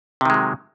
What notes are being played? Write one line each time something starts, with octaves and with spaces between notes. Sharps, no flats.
C3 D#3 F#3 G#3